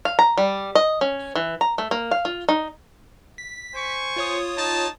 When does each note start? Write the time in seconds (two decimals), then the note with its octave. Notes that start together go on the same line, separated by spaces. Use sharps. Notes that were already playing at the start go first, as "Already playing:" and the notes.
0.05 F5
0.19 A#5
0.38 G3
0.75 D#5
1.01 C#4
1.36 E3
1.61 A#5
1.78 A3
1.91 A#3
2.11 F5
2.25 F4
2.49 D#4
3.38 B6
3.75 C5 G#5 C#6
4.16 F4 C#5 D#6
4.57 D#4 A5